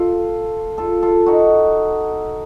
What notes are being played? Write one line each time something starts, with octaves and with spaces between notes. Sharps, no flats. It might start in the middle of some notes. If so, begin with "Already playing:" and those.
Already playing: F4 A4
F4 A4
F4 A4
D#4 F#4